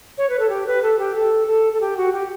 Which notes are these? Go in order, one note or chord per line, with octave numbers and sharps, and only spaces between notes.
C#5
B4
A4
G4
B4
A4
G4
A4
A4
A4
G4
F#4
G4